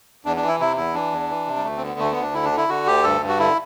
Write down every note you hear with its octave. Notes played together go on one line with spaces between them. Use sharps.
E2 D4
D4
E3
E4
C3 E4
E2 E4
E3 D4
E2
E3
C3
G3
D2 A3
C4
D3 B3
D2 A3
B3
D2
D4
D3 E4
D4
D3
E4
D3 F#4
D2 G4
G2 A4
G2
F#4
D3 E4